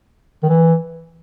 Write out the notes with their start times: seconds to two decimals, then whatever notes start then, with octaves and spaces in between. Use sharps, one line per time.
0.43 D#3
0.49 E3